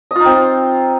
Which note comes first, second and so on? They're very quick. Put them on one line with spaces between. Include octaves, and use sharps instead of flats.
D#5 F4 D#4 C4